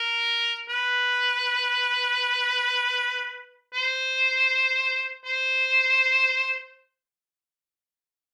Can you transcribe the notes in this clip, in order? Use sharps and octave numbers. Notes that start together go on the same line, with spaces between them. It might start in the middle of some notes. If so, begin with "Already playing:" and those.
Already playing: A#4
B4
C5
C5